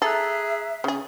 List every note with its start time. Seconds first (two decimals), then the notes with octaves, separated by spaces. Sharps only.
0.02 G#4 A4 E5 A#5 F#6
0.84 C#3 G#4